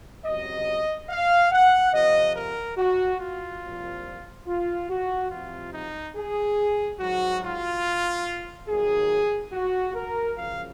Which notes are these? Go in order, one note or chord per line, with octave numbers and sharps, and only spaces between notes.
C#2 C3 F#3 D#5
F5
F#5
F2 C3 F3 D#5
A#4
F#4
F4
C2 A#2 F3
F4
F#4
C2 C3 F3 F4
D#4
G#4
G#2 F#3 F#4
F4
D#2 D#3 F#3 G#4
F#4
A#4
F#2 C#3 F3 F5